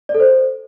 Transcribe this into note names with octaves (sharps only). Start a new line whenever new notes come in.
D5
A4
C5